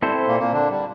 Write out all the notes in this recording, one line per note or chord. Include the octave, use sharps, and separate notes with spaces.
G3 C4 E4 A4 C5
A#2 A#3
A#2 A#3
D3 D4
G3